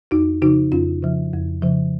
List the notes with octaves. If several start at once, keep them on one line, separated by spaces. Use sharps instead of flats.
F2 D#4 F#4
C#3 F3 D#4 F#4
F2 C#4 F4
C#3 F3
F2
C#3 F3